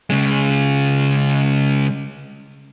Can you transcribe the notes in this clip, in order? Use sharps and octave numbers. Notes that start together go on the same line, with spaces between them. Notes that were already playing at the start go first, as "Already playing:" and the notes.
C#3 G#3